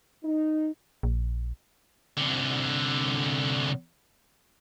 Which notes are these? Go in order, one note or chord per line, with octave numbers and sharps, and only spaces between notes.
D#4
A#1
C2 D3